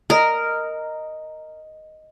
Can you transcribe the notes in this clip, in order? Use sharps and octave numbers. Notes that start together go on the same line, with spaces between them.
A#4 D#5 D#6